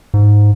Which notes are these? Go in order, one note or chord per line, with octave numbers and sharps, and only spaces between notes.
G#2